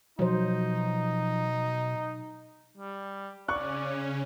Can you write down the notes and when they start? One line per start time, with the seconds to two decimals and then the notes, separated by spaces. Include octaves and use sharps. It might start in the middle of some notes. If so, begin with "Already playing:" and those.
0.19 B2 F3 F#3 D#4 C5
2.78 G3
3.48 C#3 C#4 D5 C#6 F#6